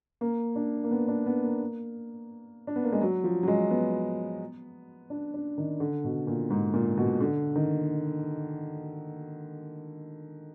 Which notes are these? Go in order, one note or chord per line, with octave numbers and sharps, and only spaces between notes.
A#3
D4
A#3
B3
D4
B3
A#3
D4
B3
A#3
G#3
F#3
F3
F#3
G#3
B3
D4
D4
D#3
D3
B2
A#2
G#2
A#2
B2
D3
D#3